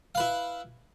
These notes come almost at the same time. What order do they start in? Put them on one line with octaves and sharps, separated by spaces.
F5 B4 E4